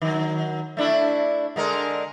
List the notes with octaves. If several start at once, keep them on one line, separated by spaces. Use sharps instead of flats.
D#3 F#3
A3 D4 E4
D3 G#3 A#4